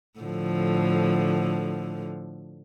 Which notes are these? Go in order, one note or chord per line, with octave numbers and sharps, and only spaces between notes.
A2 D3 F3